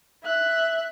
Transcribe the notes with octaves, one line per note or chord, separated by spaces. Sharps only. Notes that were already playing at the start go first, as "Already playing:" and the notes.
E5 F#6